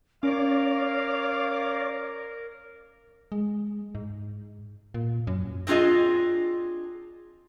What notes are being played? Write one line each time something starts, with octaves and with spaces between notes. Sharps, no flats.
C#4 A#4 C#5 D5 F5 D6
G#3
G#2
A#2
F#2
C4 D4 F4 G#4 D#5